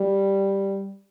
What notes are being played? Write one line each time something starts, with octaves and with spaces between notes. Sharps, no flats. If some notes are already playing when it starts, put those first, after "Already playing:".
Already playing: G3